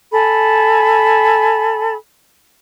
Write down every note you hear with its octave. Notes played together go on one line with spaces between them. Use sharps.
A4 G#5 B5